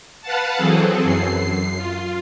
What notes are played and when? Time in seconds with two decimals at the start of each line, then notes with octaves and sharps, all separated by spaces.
0.21 B4 F5 F#5 A5
0.56 E3 F#3 C4 G#4 A4
1.03 F#2 C7
1.76 F4